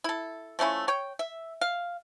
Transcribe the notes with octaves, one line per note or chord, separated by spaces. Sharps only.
E4 A4
F3 A3 C#4 E4
C#5 G5
E5
F5